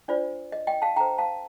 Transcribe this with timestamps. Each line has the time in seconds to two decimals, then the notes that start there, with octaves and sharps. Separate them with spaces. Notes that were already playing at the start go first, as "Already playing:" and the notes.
0.08 D4 F4 C5 D5
0.52 D#5
0.67 D#5 G5
0.82 F5 A5
0.96 D4 A4 C5 G5 A#5
1.18 F5 A5